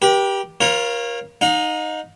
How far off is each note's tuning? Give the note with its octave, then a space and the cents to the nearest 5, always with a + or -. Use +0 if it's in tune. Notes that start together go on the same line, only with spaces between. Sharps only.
G4 +0 B4 -45
F4 +0 A#4 +30 C#5 -30
D#4 +0 F5 +45